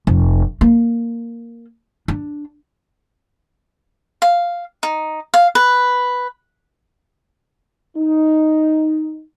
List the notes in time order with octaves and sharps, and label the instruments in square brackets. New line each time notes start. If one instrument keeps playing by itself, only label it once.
[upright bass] F1
A#3
D4
[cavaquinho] F5
D#4
F5
B4
[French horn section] D#4